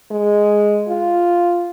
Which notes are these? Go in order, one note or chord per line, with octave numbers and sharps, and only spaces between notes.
G#3
F4